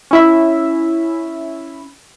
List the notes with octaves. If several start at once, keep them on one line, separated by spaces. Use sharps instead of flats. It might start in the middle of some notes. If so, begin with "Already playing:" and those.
C#4 E4 E5